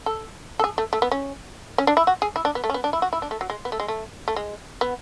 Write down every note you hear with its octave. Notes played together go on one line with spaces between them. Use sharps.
A4
A4
G#4
A3
A3
B3
C#4
C#4
D4
E4
F#4
G#4
E4
D4
B3
A3
C#4
B3
D4
E4
F#4
E4
D4
A3
F#3
G#3
B3
A3
G#3
A3
A3
G#3
B3